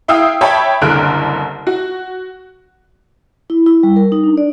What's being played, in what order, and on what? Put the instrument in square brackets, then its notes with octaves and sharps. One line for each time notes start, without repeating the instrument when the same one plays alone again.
[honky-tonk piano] E4 F5 G5 D#6 E6
C#5 E5 G5 A5 B5
F#1 C2 D3 F6 F#6 D7
F#4
[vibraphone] E4
E4
G3
A#4
D#4
D4
D5